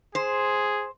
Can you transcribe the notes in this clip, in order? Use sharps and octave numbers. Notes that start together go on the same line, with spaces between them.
G#4 C5